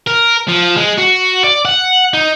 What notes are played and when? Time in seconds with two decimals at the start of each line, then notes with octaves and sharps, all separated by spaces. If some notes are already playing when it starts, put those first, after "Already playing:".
0.07 A#4
0.49 F3
0.77 G#3
0.99 F#4
1.44 D5
1.65 F#5
2.14 D#4